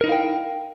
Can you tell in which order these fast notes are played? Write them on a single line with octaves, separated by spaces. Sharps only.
A#4 D#4 E4 F5 G5